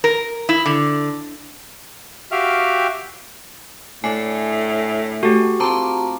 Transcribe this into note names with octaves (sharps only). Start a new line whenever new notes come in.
A#4
E4
D3
F#4 G4 E5 F5 G5 F6
A2 D4 D5 G#5 C7
A3 F#4 G4
C4 F4 A5 A#5 D6